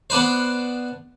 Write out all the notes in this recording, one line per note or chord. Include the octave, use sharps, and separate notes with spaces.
B3 D4 B4 C5